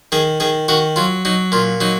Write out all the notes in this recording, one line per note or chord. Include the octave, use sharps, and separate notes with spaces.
D#3 G#4
D#3 G#4
D#3 F#4
F#3 F4
F#3 D#4
A#2 F4
F#3 D#4